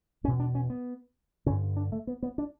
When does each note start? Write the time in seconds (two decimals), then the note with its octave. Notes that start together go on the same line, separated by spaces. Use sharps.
0.24 E2 C#4
0.28 B2
0.40 D4
0.55 C#4
0.70 B3
1.46 G2 D3 C#4
1.77 D4
1.92 A3
2.07 B3
2.23 B3
2.38 D4